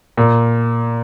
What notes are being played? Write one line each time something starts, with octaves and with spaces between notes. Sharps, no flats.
A#2